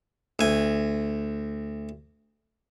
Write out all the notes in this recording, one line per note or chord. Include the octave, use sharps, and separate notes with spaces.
D2 G#5